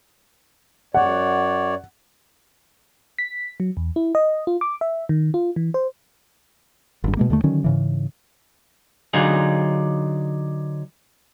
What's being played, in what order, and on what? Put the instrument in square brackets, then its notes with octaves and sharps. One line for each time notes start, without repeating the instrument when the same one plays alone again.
[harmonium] F#2 C#5 D5 [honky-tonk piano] F#5
[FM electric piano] B6
F#3
E2
E4
D#5
F4
D6
E5
D#3
F4
E3
C5
[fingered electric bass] G#1 G2
B2 G#3 A#3
D#2 D3 G#3 A3
D3 D#3 F#3 C#4
G#2 C#3 E3
[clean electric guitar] D3 F#3 D4 D#4 F4 G#4